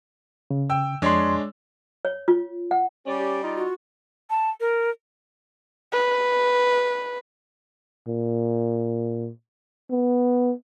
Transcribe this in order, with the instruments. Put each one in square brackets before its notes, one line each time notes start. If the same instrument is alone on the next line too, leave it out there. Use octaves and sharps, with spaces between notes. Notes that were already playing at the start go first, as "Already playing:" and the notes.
[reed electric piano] C#3
[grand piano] G5 E6
[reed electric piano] F2 C6 [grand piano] G#3 D4 C#5
[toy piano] C#5
F4
F#5
[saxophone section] G3 D5 [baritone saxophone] C#4 [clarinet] G4
[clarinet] G4
[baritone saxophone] D#4 [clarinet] F4
[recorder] F#4
[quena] A5
A#4
[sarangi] B4
[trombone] A#2
B3